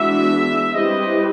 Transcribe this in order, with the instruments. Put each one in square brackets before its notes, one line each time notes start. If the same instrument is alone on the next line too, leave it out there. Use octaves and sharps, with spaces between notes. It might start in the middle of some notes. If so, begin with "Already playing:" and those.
Already playing: [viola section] E3 G#3 B3 D4 F#4 [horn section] E5
[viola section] G3 C4 E4 G4 B4 [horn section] D#5